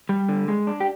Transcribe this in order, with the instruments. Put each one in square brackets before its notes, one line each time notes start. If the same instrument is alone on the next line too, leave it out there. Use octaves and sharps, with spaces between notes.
[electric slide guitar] G3
D3
G#3
D4
G4